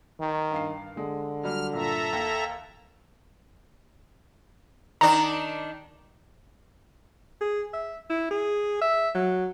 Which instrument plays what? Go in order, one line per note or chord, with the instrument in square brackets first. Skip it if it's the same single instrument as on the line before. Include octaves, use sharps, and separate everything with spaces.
[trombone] D#3
[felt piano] G2 F5 C7
[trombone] D3 [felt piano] G#3
[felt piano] F#3 G3 [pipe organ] F6
[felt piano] G2 A#2 [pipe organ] A4 E5 A#5
[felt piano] D#2
[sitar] D#3 D4 [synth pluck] A#5
[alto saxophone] G#4
E5
E4
G#4
E5
F#3